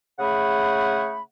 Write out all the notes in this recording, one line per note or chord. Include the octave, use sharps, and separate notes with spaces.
C#3 A3 G#4 F#5 B5